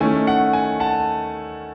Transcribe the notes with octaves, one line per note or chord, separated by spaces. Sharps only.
D#3 A3 C#4 E4 G#5
F#5
G#5
F#5 A5